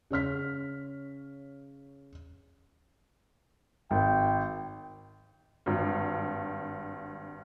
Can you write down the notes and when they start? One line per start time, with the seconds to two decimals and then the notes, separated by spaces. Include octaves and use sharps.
0.11 C#3 C#5 F6 B6
3.91 G#1 G5
5.66 G#1 G2